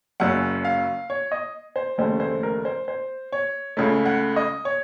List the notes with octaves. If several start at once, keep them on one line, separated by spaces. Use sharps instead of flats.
F#1 F#2 C#3 F#5
F5
C#5
D#5
C5
F1 D#2 C#3 A3 C5
C5
A#4
C5
C5
C#5
C#2 C#3 A3 C#4
F#5
D#5
C#5